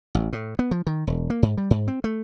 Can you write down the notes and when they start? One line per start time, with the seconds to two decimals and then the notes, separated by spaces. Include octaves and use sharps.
0.15 A1
0.33 A2
0.59 B3
0.71 F3
0.87 D#3
1.07 E1
1.30 A#3
1.43 G#2
1.57 G3
1.71 G#2
1.88 C4
2.04 A3